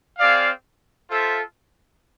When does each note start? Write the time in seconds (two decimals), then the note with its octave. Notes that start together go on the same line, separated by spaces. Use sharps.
0.18 C4 G#4 D5 F5
1.09 F4 A4 C5 E5